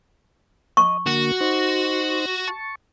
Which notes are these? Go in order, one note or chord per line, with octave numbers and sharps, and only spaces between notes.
D#5 C#6
D3 A#3 F#4
D#4 C5
A5 C#6